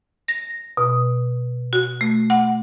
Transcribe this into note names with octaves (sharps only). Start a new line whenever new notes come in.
A#6
B2
F#4
A3
F#5